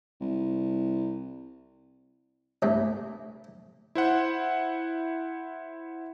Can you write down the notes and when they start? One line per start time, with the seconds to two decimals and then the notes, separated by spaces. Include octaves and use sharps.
0.21 C2
2.62 C2 G2 A3 A#3
3.95 E4 C5 F#5